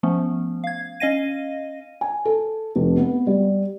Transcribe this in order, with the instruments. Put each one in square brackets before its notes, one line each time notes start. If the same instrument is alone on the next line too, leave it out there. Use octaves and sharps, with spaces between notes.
[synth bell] F3 A3 B3 C#4
F5 G#6
C#4 D#5 F5 A#6 D#7
[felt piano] G#5
A4
F1
B3
G3